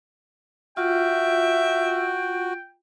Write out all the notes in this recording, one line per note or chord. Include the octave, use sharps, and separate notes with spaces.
F4 F#4 E5 G5